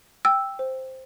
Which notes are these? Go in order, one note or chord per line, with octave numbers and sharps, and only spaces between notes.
G5 E6
C5